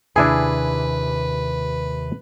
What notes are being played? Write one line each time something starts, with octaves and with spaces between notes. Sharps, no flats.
D#2 C3 D4 E4 G#4 B4 G#5